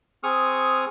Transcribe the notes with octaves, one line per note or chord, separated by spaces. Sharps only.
C4 G#4 C#6 D#6 F6